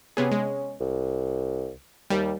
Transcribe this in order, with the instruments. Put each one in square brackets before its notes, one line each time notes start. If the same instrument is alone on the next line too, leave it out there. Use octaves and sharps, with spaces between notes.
[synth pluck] C3 B3 G#4 [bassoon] C#4
[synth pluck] G#3
[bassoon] C2
[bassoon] D#2 [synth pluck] G3